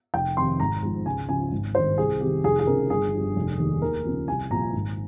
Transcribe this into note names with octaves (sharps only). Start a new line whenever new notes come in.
F1 G5
F2 C3 D#3 C6
G#1 A#5
G#2 F3
C#2 G#5
C#3 F3 G#5
G#1
G2 D#3 C5
C2 G#4
C3 D#3 G4
F1 G#4
G#4
F2 C#3 F3 A#4
G1 G#4
G2 F3
F1
D#2 D#3
D#2 A#4
C#3 F3
C2 G#5
A#2 F3 A#5
G#1